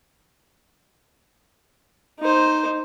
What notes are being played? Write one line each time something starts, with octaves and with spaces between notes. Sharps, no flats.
D#4 C5